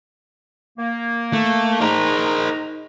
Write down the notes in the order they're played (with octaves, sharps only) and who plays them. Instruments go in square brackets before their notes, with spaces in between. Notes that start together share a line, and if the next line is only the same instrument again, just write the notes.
[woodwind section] A#3
[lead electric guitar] A3
[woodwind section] D#3 G#4 A#5 [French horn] D#4 [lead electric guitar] A#4 C5